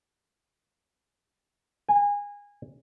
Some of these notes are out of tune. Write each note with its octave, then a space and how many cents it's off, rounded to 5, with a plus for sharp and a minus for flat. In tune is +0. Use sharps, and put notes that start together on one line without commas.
G#5 -25